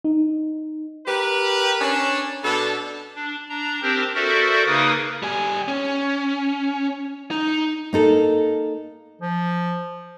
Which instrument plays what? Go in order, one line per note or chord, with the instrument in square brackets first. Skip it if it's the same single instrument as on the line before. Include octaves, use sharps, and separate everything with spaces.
[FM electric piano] D#4
[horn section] G4 A#4 B4
C#4 D4
B2 D4 A4
[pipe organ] D4
D4 A#5
C4 D4 G4 A#4 C5
F#4 A4 A#4 C5 D5 E5
C#3 A#3 D#4 A#4 B4 D#6
[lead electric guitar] G3 G#5
C#4
D#4
[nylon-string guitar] A#3 D#4 A4
[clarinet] F3